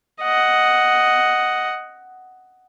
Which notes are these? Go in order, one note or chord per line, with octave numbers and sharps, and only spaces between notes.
D#5 F#5